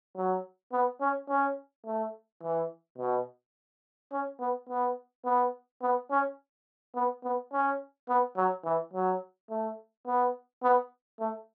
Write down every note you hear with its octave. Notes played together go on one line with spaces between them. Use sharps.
F#3
B3
C#4
C#4
A3
E3
B2
C#4
B3
B3
B3
B3
C#4
B3
B3
C#4
B3
F#3
E3
F#3
A3
B3
B3
A3